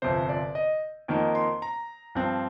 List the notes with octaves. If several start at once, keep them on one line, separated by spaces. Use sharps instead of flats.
G1 F2 C3 C5
D5
D#5
F2 D#3 A#3 D#4
C6
A#5
G2 F3 C4